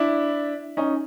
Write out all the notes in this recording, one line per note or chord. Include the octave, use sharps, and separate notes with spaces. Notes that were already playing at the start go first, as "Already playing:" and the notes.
Already playing: D4 E4
C#4 D#4